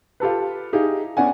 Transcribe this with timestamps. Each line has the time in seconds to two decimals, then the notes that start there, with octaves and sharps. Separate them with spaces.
0.20 F4 G4 A4 B4
0.73 D#4 E4 G4 G#4 F5
1.17 B3 C#4 D4 F#5 G#5